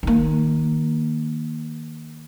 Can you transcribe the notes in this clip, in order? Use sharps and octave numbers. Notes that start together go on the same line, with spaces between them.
D#3 A#3